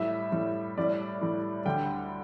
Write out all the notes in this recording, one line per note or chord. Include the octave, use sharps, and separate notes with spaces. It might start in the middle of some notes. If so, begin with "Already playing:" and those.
Already playing: A2 G3 E5
A2 G3
A2 G3 D5
A2 G3
D2 D3 G3 G5